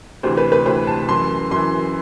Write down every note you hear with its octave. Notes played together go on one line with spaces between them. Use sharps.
D2 C3 E3 C5
B4
B4
D2 C3 E3 C5
A5
F#2 E3 C6
F#2 E3 C6